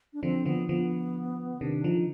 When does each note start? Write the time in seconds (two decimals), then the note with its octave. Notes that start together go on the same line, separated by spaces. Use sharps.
0.13 D4
0.23 D3 F3 C4
0.46 D3 F3 B3
0.69 D3 F3 B3
1.61 C3 D#3 D4
1.84 D3 F3 D#4